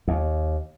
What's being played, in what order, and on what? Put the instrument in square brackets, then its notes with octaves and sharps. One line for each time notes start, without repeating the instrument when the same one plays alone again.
[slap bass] D#2